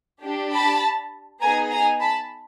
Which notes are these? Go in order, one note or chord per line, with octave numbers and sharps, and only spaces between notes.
D4 G4
A5 B5
B3 D#4 G#4 G#5 A#5
G#5 A#5
A5 B5